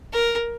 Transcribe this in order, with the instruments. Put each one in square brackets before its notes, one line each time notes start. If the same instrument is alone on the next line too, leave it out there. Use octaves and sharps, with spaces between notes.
[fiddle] A#4